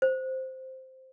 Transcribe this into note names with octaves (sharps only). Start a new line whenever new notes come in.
C5